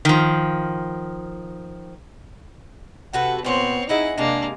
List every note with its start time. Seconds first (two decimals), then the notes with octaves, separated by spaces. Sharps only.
0.05 D#3 F3
3.13 C3 F#4 A4 B4 F#5
3.44 A#2 B3 C4 C5 C#5
3.89 D#4 E4 G#4 D#5 E5 F#5
4.18 C3 G#3 A#3 D4